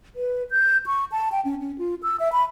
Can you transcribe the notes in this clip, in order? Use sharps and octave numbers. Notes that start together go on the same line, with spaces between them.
B4
G6
C#6
A5
G5
C#4
C#4
F4
E6
E5
B5